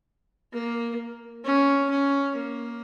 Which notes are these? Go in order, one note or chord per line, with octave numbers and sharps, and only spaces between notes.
A#3
C#4
C#4
A#3